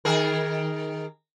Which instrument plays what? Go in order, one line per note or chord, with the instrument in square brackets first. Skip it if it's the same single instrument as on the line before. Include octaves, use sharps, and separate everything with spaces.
[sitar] D#3 G#4 A#4